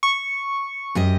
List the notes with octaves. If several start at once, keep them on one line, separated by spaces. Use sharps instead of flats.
C#6
F#2 G4 D#5